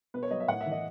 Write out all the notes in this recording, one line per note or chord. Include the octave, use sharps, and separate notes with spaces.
B2 B4
C#5
F#3 D#5
E5
A2 F#5
E5
E3
D#5